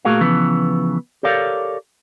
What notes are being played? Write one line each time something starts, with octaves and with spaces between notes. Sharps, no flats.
A#2 A3 F#4 G#4 A#4 F5
C#3 E3 F3 B3
G4 A4 A#4 C#5 D5 F5